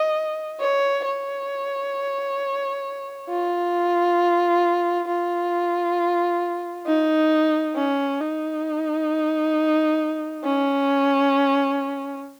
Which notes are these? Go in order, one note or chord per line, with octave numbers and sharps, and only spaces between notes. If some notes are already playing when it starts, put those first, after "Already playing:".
Already playing: D#5
C#5
C#5
F4
F4
D#4
C#4
D#4
C#4